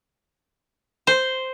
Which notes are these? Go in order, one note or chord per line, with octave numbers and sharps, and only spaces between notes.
C5